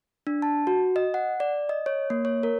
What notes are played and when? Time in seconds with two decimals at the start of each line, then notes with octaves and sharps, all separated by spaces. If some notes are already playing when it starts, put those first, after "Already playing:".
0.27 D4
0.42 A5
0.67 F#4
0.96 D#5
1.14 F#5
1.40 D5
1.69 D#5
1.86 C#5
2.10 A#3
2.25 C#5
2.43 A#4